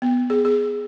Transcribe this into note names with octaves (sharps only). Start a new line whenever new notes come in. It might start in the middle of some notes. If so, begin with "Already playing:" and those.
B3
G#4
G#4